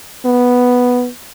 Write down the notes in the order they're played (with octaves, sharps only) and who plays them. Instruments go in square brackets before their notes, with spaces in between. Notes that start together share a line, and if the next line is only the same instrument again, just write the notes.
[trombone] B3